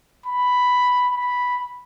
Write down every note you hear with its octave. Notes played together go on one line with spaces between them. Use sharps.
B5
B5